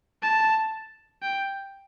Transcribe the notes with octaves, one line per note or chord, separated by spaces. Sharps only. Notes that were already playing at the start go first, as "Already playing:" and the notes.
A5
G5